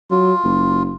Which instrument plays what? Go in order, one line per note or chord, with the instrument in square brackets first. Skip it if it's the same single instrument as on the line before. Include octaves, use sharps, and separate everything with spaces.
[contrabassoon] F#3 [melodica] F4
[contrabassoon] F#1